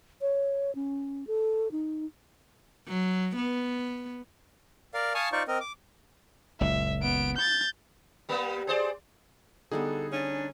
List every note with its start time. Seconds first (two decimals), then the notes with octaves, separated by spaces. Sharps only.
0.21 C#5
0.75 C#4
1.27 A4
1.72 D#4
2.88 F#3
3.36 B3
4.94 A#4 D5 F5
5.15 F5 G#5 A5 C#6 D#6 F6
5.32 D#4 F4 C5 D5 C#6
5.48 C4 A#4 D#5
5.61 D6
6.61 F#1 C#2 A#2 E5
7.02 B3 D7
7.37 G6 A6
8.29 G3 A#3 B3
8.67 G#4 C5 D5
9.72 D3 G3 B3 D#4 G#4 A4
10.12 C#4 D4